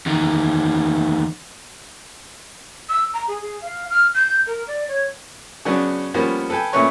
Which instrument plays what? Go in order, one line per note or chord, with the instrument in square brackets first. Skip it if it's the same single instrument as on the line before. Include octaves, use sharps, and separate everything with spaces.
[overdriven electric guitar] E2 D#3
[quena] E6
A#5
G#4
G#4
F5
F6
G6
A#4
D5
C#5
[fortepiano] C#3 F#3 B3 C#4 D4
F3 G3 A#3 B3 C#4
A4 B4 G5 G#5
A#2 A3 C#4 B4 C#5 C#6